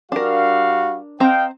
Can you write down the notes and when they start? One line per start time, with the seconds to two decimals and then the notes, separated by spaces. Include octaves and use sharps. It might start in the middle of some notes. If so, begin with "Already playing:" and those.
0.12 G3 D4 F#4 A#4 F5
1.20 C4 D#5 F5 G5 A#5